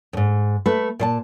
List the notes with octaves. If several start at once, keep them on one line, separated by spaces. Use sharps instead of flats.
F2 G#2
A3 B4
A#2 C5 A5